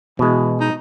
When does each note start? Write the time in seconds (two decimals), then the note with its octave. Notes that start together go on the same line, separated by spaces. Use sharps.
0.19 B2 E3 G#3
0.60 D#4